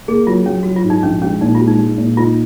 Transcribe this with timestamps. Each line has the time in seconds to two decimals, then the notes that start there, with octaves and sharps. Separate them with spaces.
0.08 A#3 G#4
0.27 F#3 F4
0.46 F#3 C#4
0.63 F#3 F#4
0.76 F4
0.84 G#2
0.90 D#4
1.03 A#1 C#4
1.22 G#3 C#4
1.41 A#2 D#4
1.55 F4
1.60 G#3
1.68 D#4
1.79 G#3
1.98 A#2
2.17 D#4 F4